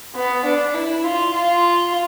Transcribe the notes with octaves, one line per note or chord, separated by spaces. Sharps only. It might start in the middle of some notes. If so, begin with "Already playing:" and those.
B3
D4
E4
F4
F4